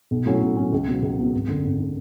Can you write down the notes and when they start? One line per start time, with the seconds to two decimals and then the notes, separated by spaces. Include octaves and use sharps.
0.11 B1
0.26 A2 F#3 C#4
0.41 B1
0.57 A2 F#3 C#4
0.73 C#2
0.88 B2 F#3 B3
1.03 C#2
1.19 B2 F#3 B3
1.34 G#1
1.48 F#2 D3
1.65 G#1
1.80 D3